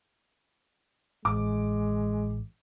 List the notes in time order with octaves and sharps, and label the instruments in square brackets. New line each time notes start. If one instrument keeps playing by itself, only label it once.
[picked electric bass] A1 [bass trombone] G#3 [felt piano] D6